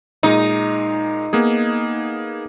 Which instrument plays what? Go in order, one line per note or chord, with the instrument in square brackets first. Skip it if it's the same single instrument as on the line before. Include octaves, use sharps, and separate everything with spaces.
[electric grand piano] A#2 G#3 [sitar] D#4
[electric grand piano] A#3 B3 G#4